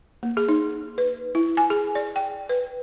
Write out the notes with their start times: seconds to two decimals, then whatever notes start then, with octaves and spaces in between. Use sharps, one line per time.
0.23 A#3
0.37 G#4
0.49 D#4
0.98 B4
1.35 E4
1.57 G#5
1.70 G#4
1.95 D5
2.16 G5
2.49 B4